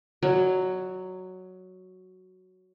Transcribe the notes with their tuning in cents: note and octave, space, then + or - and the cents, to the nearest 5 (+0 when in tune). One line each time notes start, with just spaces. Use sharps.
F#3 +0 D5 +45 G#5 +0